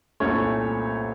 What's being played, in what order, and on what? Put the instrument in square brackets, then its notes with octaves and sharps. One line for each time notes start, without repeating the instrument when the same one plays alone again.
[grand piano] C2 A#2 A3 C#4 C#5